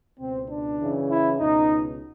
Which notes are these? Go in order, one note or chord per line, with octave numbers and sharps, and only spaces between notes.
C#2 B2 C4
D4
F#2 C#3 E3
E4
C#2 B2 D#4